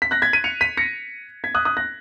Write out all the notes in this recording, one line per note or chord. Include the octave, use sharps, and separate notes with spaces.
B6
F#6 A#6
G#6 B6
B6 D#7
C#7 F7
B6 D#7
A#6 C#7
G#6 B6
D#6 F#6
D#6 F#6
F#6 A#6